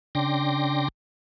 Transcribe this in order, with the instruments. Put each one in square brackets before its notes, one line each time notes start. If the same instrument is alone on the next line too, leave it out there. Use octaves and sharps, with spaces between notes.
[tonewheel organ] C#3 D4 G5 C6 D6 A#6